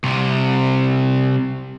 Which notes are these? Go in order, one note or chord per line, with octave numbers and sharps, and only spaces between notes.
C2 C3